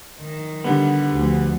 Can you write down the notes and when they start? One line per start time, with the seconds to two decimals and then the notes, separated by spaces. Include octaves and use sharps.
0.21 D#3
0.64 D3 G3 B3
1.12 D2 F3